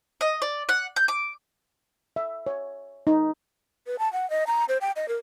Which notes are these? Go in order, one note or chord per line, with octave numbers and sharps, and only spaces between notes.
D#5
D5
F#5
G6
D6
E5
C#5
D#4
B4
A5
F#5
D#5
A#5
C5
G5
D#5
A#4